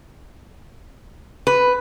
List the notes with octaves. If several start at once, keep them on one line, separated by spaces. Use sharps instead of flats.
B4